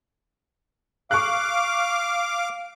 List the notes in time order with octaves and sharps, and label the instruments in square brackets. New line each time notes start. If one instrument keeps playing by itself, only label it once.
[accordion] F5 D6 [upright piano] C#6 F#6